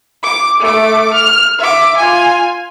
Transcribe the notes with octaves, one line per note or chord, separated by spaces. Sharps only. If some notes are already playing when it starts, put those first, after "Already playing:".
D6
A3 D6
F6
E5 D6
F4 G#5